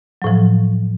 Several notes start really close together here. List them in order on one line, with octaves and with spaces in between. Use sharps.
F#3 A2 F3